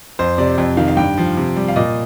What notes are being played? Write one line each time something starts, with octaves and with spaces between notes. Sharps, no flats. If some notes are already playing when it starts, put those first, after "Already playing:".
F2 C5
C3 D5
F2
D#3 F5
F5
G2 G5
F3
C3
G3
F5
A#2 D#5